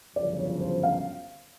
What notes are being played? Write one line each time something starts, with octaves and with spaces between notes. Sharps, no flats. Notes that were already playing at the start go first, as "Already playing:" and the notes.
G1 F#2 C#3 F3 D5
C#5
C5
F5